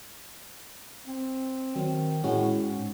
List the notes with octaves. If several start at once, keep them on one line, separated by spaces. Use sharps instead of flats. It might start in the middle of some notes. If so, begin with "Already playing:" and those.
C4
D#3 F#3 C4
A2 G#3 C#4 F#4
G#2